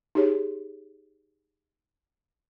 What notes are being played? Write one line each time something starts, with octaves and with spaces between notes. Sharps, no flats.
D#4 G4 G#4 C#5